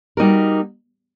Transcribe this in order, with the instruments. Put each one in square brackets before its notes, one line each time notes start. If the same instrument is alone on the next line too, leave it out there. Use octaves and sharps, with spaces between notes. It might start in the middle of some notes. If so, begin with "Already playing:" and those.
[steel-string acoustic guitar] G3 A#3 D#4 F#4 A#4